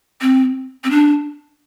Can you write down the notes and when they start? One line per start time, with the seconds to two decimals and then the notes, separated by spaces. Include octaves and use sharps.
0.21 C4
0.84 C4
0.91 D4